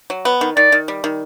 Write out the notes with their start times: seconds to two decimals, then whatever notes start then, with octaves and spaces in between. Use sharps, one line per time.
0.10 F#3
0.25 B3
0.41 D#3
0.57 D#3 D5
0.72 D#3
0.88 G3
1.04 D#3